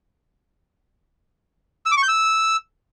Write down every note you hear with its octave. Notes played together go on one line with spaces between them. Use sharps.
E6
D6
C#6
G6
E6